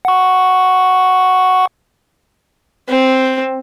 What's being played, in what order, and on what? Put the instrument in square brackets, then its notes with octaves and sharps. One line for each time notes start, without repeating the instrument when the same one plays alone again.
[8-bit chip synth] F#5 C#6
[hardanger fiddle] C4